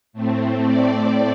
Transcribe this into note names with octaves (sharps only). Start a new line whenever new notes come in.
A2 A3 C4
D5